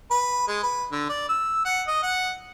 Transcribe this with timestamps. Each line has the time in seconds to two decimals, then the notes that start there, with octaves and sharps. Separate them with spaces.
0.11 B4
0.48 G#3
0.63 B4
0.92 D3
1.09 D5
1.29 E6
1.65 F#5
1.87 D#5
2.03 F#5